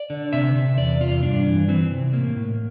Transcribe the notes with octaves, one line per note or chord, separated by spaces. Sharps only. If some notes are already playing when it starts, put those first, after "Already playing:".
Already playing: D5
D3
C3 E5
C3
E2 D5
C3 F4
G2 D4
E3
E3 C4
C3
A2 A#3
A2